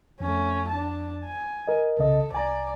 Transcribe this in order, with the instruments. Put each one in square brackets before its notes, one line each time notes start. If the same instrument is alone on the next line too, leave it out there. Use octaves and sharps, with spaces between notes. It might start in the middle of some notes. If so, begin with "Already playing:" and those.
[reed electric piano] F2 [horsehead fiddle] A3 C#4
[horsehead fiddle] D4 A5
G#5
[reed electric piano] A#4 D#5
[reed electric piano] C2 C#3 D#5 [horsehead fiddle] A4
[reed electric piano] C2 G#5 A#5 [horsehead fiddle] D5